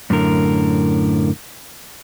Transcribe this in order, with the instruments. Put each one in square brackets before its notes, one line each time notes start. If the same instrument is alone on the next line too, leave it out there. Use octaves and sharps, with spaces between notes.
[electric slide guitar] F#2 A2 D3 A#4